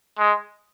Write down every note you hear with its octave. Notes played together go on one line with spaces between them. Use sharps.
G#3